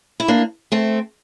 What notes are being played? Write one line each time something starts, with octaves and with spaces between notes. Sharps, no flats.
E4
A#3 D4
A3 C4